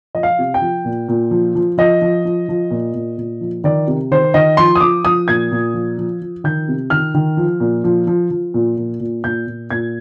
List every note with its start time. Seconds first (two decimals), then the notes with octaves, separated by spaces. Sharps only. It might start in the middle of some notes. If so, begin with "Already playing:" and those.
0.14 F3 D#5
0.23 F5
0.39 C3
0.54 G5
0.62 F3
0.85 A#2
1.09 A#2
1.31 F3
1.55 F3
1.78 F3 D#5
2.02 F3
2.25 F3
2.49 F3
2.71 A#2
2.94 A#2
3.18 A#2
3.41 F3
3.64 D#3 D5
3.87 C3
4.11 D#3 C5
4.34 D#3 D#5
4.57 F3 C6
4.75 D#6
4.80 F3 D6
5.04 F3 D#6
5.28 A#2 G#6
5.52 A#2
5.74 F3
5.98 F3
6.22 F3
6.44 D#3 G6
6.68 C3
6.90 D#3 F6
7.14 D#3
7.37 F3
7.60 A#2
7.84 F3
8.07 F3
8.31 F3
8.54 A#2
8.77 A#2
9.00 A#2
9.24 A#2 G6
9.47 A#2
9.70 A#2 G#6